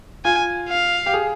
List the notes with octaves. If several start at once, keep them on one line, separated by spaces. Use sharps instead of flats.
F4 G#5
F5
G4
G#4